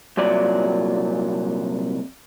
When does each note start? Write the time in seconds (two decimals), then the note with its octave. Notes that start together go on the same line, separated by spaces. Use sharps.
0.17 C2 A#2 F#3 D5